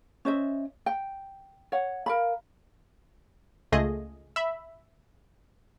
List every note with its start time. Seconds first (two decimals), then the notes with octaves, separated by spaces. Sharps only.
0.25 C#4 C5 D#5 E5
0.86 G5
1.72 C#5 F#5
2.06 A#4 F5 B5
3.72 C#2 A3 F4 G#4 D#5
4.36 E5 B5